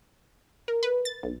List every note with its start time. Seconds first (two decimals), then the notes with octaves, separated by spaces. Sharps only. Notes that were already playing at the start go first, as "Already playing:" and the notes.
0.68 A#4
0.83 B4
1.05 A6
1.23 B1